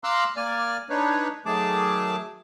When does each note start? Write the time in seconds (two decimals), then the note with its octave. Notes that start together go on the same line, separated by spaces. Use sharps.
0.04 F5 A#5 C6 D6 E6 F#6
0.37 A#3 D5 G#5 F6
0.90 D4 D#4 B4 C#5
1.46 D#3 F#3 A3 G#4 A5 D6